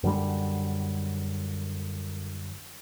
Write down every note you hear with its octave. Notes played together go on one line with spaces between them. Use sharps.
F#2 D3 G3